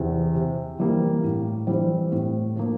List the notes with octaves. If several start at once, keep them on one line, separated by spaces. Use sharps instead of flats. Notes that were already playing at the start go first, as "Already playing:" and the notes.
Already playing: E2 C3
C3
E3 G3 A#3
A2
E3 G3 C4
A2
F3 A#3